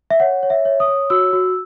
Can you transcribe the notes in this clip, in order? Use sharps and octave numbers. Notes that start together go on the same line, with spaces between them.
E5
C#5 F#5
C#5
E5
C#5
D#6
C#5
F#4 E6
F#4